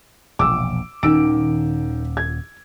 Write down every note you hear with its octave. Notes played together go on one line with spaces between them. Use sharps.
E1 A#1 D6 E6
D#1 D#3 C#4 E6 D7
G#6